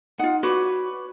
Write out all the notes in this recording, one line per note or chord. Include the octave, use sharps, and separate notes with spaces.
D#4 F4 F#5
F#4 B4 C#5 D5